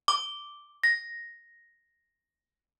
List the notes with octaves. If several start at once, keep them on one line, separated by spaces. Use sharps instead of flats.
D6
A#6